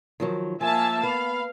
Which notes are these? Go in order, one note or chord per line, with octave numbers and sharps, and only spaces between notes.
D#3 F3 F#3
F3 A#3 E5 G#5 A5
B3 F5 B5